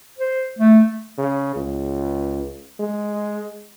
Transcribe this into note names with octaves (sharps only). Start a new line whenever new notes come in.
C5
A3
C#3
C#2
G#3